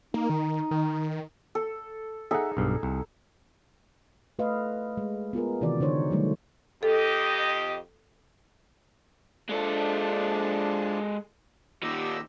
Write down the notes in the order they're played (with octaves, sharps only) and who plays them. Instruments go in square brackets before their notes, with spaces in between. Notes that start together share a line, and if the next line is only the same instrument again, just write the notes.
[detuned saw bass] A#3 [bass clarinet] D#4
[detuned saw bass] D#3
D#3
[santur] A4
[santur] D#4 G#4 A4 [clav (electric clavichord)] E5 F#5
[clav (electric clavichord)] B1 G2
C2
[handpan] A3 B4 D#5 F5
G#3
B3 F4 G#4 A#4
C3 D#3 E3 D#4 F#4 D5
D3 D#4 C5 C#5
D#3 F#3 G3 A3
[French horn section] F2 G4 D#5 [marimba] A4
[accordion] F3 D4 [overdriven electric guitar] G#3 A4
[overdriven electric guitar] A#2 D#3 [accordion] G4 D#5 E6